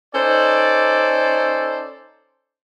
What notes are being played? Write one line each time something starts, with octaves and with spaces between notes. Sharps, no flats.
C#4 D#4 A4 C5 D5